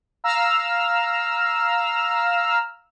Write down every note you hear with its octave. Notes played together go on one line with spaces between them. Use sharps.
F5 A#5 E6 F6